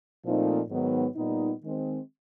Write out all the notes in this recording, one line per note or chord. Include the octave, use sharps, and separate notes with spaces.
A#2 F3 A3 C4 D#4
G#2 D#3 F#3 B3
A#2 G3 B3 D#4
D#3 G#3 C4